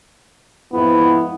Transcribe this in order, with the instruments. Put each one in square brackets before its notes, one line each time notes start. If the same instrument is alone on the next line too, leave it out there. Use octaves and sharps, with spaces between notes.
[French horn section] F2 G#2 E4 [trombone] B3